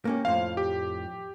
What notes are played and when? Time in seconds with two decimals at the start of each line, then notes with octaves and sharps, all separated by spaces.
0.05 A#3 C#4 G4
0.25 F2 A2 C5 F5
0.57 G4